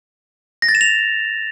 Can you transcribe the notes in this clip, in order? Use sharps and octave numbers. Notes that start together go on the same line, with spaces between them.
A#6
A6
E7
F7